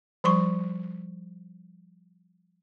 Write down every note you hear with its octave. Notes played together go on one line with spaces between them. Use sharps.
F3 G3 C6 C#6